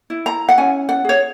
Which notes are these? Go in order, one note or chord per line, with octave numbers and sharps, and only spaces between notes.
E4
A#5
F#5
C#4 G#5
F#5
G#4 C#5